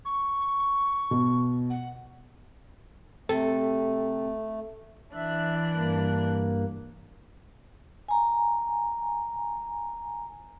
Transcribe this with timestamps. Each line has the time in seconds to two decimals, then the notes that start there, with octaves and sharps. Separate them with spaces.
0.05 C#6
1.11 B2
1.70 F#5
3.29 C3 A3 A4
5.14 E3 D4 E5 F#6
5.75 G2 A#3
8.08 G#5 A#5